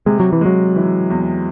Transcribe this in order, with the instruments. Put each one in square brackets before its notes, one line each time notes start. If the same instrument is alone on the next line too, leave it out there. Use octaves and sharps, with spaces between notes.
[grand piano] C3 [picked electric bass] G#3
[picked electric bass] F#3
E3
[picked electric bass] F#3 [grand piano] G#3
[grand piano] E3
E2